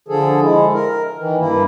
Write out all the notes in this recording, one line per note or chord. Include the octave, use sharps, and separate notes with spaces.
D3 F3 G#4 A4
G#3 E4
A#4
D#3 E3
G2 A#3 E4